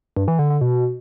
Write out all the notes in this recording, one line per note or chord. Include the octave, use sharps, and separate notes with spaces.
G2
E3
D3
D3
B2